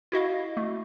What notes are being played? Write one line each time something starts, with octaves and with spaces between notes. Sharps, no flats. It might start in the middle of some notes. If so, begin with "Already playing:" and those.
E4 F#4 D#5 F5
A3